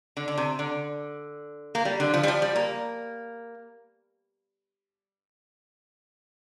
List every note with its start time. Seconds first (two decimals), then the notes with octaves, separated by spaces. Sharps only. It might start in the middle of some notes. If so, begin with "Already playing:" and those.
0.17 D3
0.28 D3
0.38 C3
0.59 D3
1.75 A#3
1.85 G3
2.00 D3
2.14 F3
2.23 G3
2.28 F3
2.42 G3
2.56 A#3